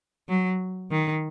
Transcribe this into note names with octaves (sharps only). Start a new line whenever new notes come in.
F#3
D#3